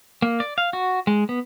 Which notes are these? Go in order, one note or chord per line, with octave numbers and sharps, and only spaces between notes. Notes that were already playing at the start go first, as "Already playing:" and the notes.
A#3
D5
F5
F#4
G#3
B3